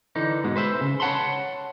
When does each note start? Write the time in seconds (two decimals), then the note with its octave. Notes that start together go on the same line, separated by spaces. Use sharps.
0.16 D3 E3 D#4
0.44 G#2 B2 G#3
0.56 B4 C5 E5
0.81 C#3
1.00 C#5 F#5 A5 B5 C6